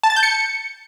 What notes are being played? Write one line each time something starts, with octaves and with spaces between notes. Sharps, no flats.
A5
A6
G6
C#7